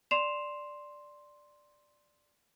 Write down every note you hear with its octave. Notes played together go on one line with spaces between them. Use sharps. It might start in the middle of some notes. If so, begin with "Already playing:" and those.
D5 C6 C7 E7 F7